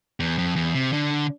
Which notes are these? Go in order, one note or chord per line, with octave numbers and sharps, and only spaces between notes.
E2
F2
E2
C3
D3